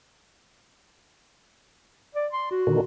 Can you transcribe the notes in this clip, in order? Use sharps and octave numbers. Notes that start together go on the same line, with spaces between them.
D5
C6
F#4
A#2 D3 D#3